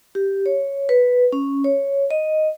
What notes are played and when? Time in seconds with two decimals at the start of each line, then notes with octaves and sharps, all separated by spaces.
0.15 G4
0.46 C#5
0.89 B4
1.33 C#4
1.64 C#5
2.11 D#5